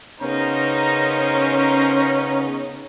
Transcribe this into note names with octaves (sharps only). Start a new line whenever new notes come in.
C#3 B3 C#4 D#4 A#4 C5 A#5